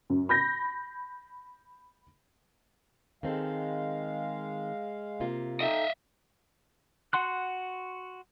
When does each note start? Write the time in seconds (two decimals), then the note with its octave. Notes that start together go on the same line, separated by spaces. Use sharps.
0.10 F#2
0.29 B5 G6 A#6
3.23 D#3 G#3 C4 A4 F5
5.20 C3 A#3 F4
5.60 D#4 A4 D#5 E5 G5
7.13 F#4 F#5 C6 F#6